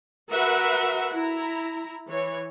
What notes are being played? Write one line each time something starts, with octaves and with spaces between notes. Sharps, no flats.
F#4 A#4 B4 E5 F#5
E4 A#5
E3 C#5